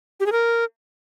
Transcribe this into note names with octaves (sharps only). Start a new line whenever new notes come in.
G4
G#4
A#4